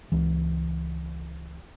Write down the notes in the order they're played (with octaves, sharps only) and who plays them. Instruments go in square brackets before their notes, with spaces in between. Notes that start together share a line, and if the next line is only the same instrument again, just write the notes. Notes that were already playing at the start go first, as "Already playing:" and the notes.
[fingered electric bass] C#2 E3